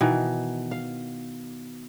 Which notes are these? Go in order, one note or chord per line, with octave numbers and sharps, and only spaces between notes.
B2 D#3 E3
F5